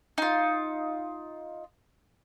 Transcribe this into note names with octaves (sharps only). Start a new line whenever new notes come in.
D#4 F4